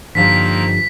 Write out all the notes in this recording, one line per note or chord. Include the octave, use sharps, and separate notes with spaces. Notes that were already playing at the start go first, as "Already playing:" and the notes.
G2 D3 D#3 F3 G3 A#3 C4 B6